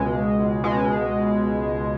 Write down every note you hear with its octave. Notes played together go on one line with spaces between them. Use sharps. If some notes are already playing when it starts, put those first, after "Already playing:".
Already playing: C#2 B2 G#3
C#2 B2 G#3